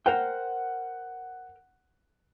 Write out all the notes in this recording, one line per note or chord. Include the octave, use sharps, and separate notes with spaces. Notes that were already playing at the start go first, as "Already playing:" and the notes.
A#4 C5 F#5 G5